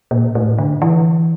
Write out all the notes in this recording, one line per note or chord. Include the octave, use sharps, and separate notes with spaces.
A#2
A2
D3
E3